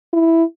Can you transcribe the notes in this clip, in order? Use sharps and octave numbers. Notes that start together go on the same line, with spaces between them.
E4